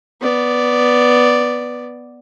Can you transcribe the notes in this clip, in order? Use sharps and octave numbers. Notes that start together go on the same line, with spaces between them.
B3 D5